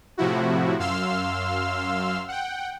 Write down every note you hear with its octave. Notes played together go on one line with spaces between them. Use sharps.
A2 C3 F3 E4 F#4
F#2 F5 C6 E6 F6
F#5 G5